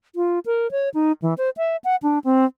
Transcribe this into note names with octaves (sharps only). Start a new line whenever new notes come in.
F4
A#4
C#5
D#4
E3
C5
E5
F#5
D4
C4